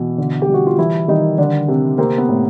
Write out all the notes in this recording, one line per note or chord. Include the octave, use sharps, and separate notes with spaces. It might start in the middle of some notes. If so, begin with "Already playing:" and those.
Already playing: B2 E3
D3
G4
G3
F#4
F4
E3 G3 E4
D#3 G3 D#4
D3 D#3 D4
C3
C3 A#3 C4
B3
A2